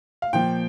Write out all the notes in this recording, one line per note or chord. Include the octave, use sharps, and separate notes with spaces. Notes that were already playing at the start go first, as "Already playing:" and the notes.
F5
A#2 F3 G5